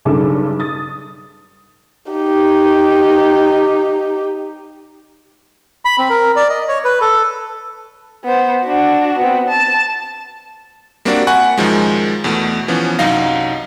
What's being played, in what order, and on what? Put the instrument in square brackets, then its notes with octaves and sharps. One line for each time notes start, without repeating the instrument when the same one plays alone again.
[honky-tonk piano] B1 G2 C#3 A4 D6
D#6 A6
[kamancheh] D#4 G4
[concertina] B5
C4
A#4
D5
D#5
C#5
B4
A4
[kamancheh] B3 C5
D4 F#4
B3 C4
A5
[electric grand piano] G3 A#3 C4 D4 F#4 D5
F#5 G#5 B5 C#6 F#6
F#2 D#3 F3 G#3
E2 B2 A3
E3 F3 B3 C#4
C2 F#2 F#3 D#4 F5 A#6